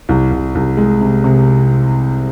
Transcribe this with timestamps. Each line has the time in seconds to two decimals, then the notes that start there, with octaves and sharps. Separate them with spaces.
0.09 C2
0.31 C2
0.55 C2
0.77 G#3
1.01 C3
1.24 C3